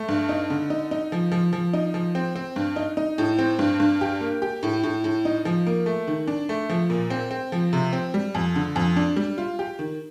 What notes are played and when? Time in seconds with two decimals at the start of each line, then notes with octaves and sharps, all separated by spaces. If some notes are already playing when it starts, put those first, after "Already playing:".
Already playing: A3
0.08 G2
0.29 D#4
0.50 D3
0.70 D#4
0.91 D#4
1.12 F3
1.32 F3
1.53 F3
1.73 D#4
1.94 F3
2.15 C4
2.36 C4
2.56 G2
2.76 D#4
2.97 D#4
3.18 A2
3.39 C4
3.59 G2
3.80 G2
4.01 G4
4.21 A#3
4.42 G4
4.63 A2
4.83 A2
5.04 A2
5.25 D#4
5.45 F3
5.67 A#3
5.86 A3
6.07 D#3
6.27 D4
6.49 A3
6.69 F3
6.90 A#2
7.10 C4
7.31 C4
7.52 F3
7.73 C3
7.93 C4
8.14 G3
8.35 F2
8.56 D3
8.76 F2
8.96 D4
9.16 G3
9.38 F4
9.59 G4
9.79 D#3